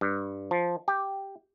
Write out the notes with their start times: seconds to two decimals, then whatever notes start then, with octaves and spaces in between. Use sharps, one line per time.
0.01 G2
0.51 F3
0.88 G4